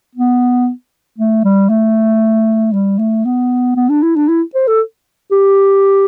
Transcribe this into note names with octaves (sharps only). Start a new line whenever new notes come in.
B3
A3
G3
A3
G3
A3
B3
B3
D4
E4
D4
E4
C5
A4
G4